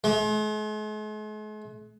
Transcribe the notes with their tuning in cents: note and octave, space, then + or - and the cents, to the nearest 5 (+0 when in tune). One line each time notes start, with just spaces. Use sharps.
G#3 +45